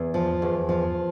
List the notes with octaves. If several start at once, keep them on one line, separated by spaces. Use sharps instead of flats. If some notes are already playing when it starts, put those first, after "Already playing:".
Already playing: E2
F3
E2
F3